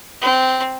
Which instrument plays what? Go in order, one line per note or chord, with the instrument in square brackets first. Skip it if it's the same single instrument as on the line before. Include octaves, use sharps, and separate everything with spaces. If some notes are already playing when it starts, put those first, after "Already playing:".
[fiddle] C4